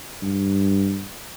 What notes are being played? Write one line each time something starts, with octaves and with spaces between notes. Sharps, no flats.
G2